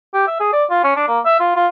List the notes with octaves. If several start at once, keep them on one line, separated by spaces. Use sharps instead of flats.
G4
E5
G#4
D5
F4
C#4
D4
A#3
E5
F4
F4